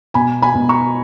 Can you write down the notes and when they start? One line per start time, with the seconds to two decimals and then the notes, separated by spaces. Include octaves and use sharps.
0.14 B2 G#5 B5
0.42 G#5 B5
0.55 B2
0.69 A#5 C#6